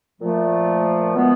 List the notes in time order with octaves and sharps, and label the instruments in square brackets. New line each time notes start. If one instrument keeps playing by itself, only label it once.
[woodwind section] A#2 F3 A3
B2 G#3 B3